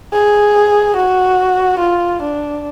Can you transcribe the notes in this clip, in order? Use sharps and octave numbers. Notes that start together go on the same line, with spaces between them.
G#4
F#4
F4
D4